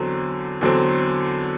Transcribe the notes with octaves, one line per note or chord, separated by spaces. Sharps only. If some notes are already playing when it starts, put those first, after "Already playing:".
Already playing: E2 D3 F#3 C4
E2 D3 F#3 C4